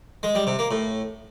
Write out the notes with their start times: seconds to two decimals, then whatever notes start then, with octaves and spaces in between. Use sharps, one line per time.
0.23 G#3
0.35 G3
0.47 C3
0.59 A#3
0.71 A2